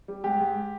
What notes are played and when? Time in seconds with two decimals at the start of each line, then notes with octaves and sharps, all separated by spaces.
0.08 G3
0.24 G#2 G4
0.40 G#2